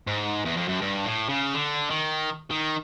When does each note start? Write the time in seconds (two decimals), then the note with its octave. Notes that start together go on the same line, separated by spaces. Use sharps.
0.07 G#2
0.45 E2
0.57 F2
0.68 F#2
0.81 G2
1.05 A2
1.29 C#3
1.54 D3
1.90 D#3
2.51 D#3